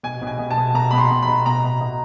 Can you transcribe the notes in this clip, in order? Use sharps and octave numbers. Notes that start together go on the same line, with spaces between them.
B2 G#5
B2
G#5
B2
A5
B2
B2 A#5
B2 B5
C6
B2
B5
B2
B2 A#5
B2
B2